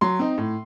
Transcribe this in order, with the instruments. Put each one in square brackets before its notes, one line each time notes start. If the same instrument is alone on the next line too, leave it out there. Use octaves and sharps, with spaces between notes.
[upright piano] F#3 C6
C4 D#4
A2